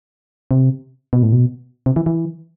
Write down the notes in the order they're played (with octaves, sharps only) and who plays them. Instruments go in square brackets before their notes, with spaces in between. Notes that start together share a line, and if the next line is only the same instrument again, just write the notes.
[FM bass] C3
B2
A2
B2
C3
E3
E3